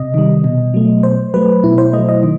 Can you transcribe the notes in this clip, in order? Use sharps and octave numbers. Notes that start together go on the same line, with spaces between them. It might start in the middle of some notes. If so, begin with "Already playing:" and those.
Already playing: C3 D#5
D#3 G3
B2
F#3 A3
B2 C5
F#3 A3 B4
B2 E4
C5
F#3 A3 D#5
D#5
D#3